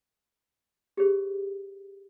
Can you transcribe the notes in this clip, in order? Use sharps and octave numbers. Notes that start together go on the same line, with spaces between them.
G4 G#4 C5